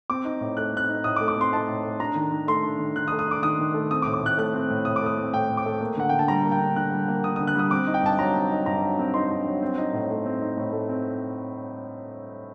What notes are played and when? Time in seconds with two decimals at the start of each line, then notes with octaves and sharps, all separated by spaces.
0.10 C4 D6
0.25 D#4
0.41 A2
0.57 A3 F#6
0.74 C4 F#6
0.89 D#4
1.04 A2 D#6
1.16 D6
1.21 A3
1.28 D6
1.37 C4 C6
1.53 D#4 A5
1.68 A2
1.84 A3
1.99 D4 A#5
2.15 D#3
2.32 D#3
2.47 A3 C6
2.63 D4
2.79 D#3
2.96 D#3 F#6
3.08 D#6
3.12 A3
3.19 D#6
3.28 D4 D6
3.42 D#3 D#6
3.59 D#3
3.74 A3
3.91 C4 D#6
4.02 D6
4.06 A2
4.14 D6
4.22 A2 F#6
4.38 A3 F#6
4.53 C4
4.70 A2
4.85 A2 D#6
4.96 D6
5.01 A3 D#6
5.18 C4
5.34 A2 G5
5.49 A2
5.57 D6
5.66 A3
5.81 A#3
5.97 D3 F#5
6.09 D3 G5
6.19 A5
6.28 G3 A#5
6.44 A#3
6.52 G5
6.60 D3
6.76 D3 F#6
6.92 G3
7.08 A#3
7.24 D3 D#6
7.36 D#6
7.40 D3
7.47 F#6
7.55 G3 D#6
7.71 C4 D6
7.87 D#4
7.94 G5
8.02 G2 A5
8.19 F#3 A#5
8.35 C4
8.51 D#4
8.66 G2 A#5
8.82 F#3
8.99 C4
9.14 D#4 C6
9.31 G2
9.46 F#3
9.62 C4
9.78 D#4
9.93 A2
10.10 A3
10.26 C4
10.41 D#4
10.57 A2
10.72 A3
10.89 C4